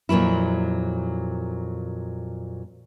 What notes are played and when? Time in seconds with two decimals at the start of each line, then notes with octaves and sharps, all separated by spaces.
0.09 F2 A#2 C#3 F#3 E4